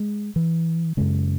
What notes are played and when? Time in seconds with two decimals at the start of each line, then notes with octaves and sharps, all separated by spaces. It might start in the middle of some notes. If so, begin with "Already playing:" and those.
Already playing: G#3
0.36 E3
0.97 F#2 C#3 G#3